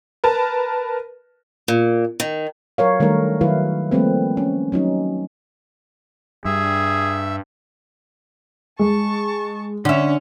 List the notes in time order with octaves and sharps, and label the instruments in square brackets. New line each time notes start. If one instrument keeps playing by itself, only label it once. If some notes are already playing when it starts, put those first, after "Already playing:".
[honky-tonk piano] A#4 B4 A5
[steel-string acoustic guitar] A#2
D#3
[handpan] F#3 A#4 C#5 F5
D#3 G3 A3 D4 A#4
D#3 F#3 E4 B4 F5
F3 G3 A3 A#3 C4 B4
C#4
F#3 C#4 D#4
[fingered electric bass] G2 [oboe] G#4 [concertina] E5
[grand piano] G#3 [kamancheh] A5 C#6
[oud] D3 E5 [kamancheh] C#4 C#5